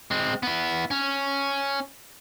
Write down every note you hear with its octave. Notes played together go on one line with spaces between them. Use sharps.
G#3 C4
B3 E4
C#4